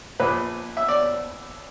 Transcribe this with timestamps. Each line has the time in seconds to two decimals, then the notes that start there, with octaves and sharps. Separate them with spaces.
0.20 A#1 A#2 B4
0.77 E5
0.88 D5